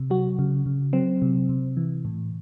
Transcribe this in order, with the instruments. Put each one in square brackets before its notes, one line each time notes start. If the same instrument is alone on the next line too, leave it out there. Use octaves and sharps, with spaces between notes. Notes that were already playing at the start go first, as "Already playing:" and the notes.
Already playing: [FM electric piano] C3
F#3 F#4
C#3
C#3
F#3 C4
C3
C3
E3
A2